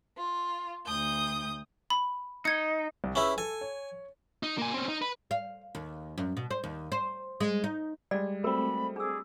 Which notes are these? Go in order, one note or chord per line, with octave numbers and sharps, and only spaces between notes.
F4
D2 D#6 G6
B5
D#4 G#6 C#7
C2
C#4 E4 G#4 B4 E6
A4 G#5
C#5
D#4
A#3 G#5
C4 C#4
D#4
B4
F5
D#2
F#2
B2
C5
D#2
C5
G#3
D#4
G3 G#3 D5
A3 C4 F#4 A#4 B5
D4 G#4 D6 E6